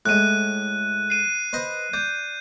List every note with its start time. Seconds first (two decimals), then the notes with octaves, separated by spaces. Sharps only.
0.06 A2 G#3 F#6 D#7
1.10 C7 D#7
1.53 B4 C5 D#5
1.93 D5 G6